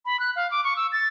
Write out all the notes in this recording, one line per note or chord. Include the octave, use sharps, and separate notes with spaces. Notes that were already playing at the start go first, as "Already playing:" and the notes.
B5
F#6
F5
D6
C#6
E6
A6